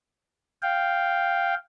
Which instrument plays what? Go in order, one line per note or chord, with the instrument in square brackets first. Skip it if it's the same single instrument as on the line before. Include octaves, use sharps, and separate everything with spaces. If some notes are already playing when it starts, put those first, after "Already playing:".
[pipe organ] F5 G5